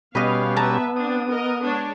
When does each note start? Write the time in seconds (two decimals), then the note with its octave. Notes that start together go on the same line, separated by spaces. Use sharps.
0.15 B2 G3 B3 C#4 B4 D#5 F5
0.56 B4 E5 A5 A#5
0.96 C4 D4 D#6
1.29 A#4 D#5
1.62 G#3 D4 C#5